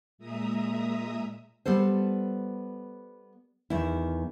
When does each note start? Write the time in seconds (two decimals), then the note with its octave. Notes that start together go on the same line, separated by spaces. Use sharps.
0.18 A#2 G#3 E5 A#5 D#6
1.65 G3 B3 A4 C5
3.70 E2 D#3 E4